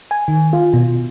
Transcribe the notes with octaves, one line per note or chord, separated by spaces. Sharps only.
G#5
D#3
F4
B2